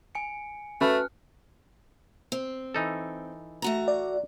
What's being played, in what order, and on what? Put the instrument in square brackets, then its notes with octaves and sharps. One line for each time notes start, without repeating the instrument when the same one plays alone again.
[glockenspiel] G#5 C#7
[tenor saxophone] A3 [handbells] C#4 B5 [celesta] F#4 B4 A5 [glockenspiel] F6 F#6
[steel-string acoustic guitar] C4
[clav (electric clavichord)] E3 D#4 A4
[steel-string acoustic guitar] A3 F#4 A#5
[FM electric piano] D5